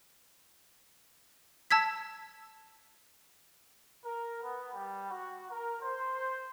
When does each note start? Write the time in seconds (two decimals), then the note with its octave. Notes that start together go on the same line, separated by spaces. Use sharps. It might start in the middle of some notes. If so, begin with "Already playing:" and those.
1.71 A5 E6 G#6 B6
4.04 A#4
4.41 B3
4.74 G3
5.10 F#4
5.50 A#4
5.81 C5